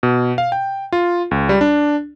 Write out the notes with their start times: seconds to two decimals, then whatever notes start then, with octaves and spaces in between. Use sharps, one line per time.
0.03 B2
0.38 F5
0.52 G5
0.92 F4
1.31 C#2
1.49 G3
1.61 D4